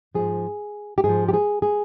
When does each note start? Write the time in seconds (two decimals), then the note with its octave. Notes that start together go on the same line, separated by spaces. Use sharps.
0.14 G#2 F3 G#4
0.98 G4
1.04 G#2 F3 G#4
1.28 G4
1.33 G#4
1.62 G#4